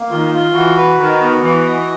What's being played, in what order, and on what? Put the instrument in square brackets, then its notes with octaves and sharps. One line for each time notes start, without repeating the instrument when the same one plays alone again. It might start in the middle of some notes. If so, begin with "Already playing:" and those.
Already playing: [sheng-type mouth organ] A#3
[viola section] D#3 [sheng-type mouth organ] F4
[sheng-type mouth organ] F4
[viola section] E3 [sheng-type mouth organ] F#4
[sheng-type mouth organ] B4
[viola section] D#3 [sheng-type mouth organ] F#4
[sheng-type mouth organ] B3
[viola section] E3 [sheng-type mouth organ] F#4
[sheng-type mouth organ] D#5